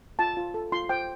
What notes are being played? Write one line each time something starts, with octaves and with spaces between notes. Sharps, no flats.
F4 A5
F4
A4
F4 C6
C5 G5